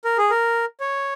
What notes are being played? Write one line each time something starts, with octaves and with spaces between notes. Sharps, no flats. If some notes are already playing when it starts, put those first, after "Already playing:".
A#4
G#4
A#4
C#5